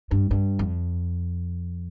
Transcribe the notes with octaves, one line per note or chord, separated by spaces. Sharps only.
G2
G2
F2